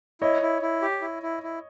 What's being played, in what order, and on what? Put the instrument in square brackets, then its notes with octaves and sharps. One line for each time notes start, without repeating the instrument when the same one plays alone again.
[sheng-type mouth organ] E4 [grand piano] C#5 D#5
[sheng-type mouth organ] E4
E4
G4
E4
E4
E4